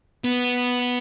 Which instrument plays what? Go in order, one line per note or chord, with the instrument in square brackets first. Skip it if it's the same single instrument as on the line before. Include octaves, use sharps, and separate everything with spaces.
[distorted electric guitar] B3